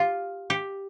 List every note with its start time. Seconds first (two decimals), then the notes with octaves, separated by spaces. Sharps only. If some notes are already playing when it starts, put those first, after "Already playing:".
Already playing: F4 G4
0.50 G4